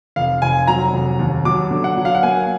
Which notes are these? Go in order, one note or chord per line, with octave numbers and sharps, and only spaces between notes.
F1 F5
F1 G#5
F#3 A#5
F1
D#2
F#3 D6
D3
F#5
F#3
F5
F#5
A#3 G#5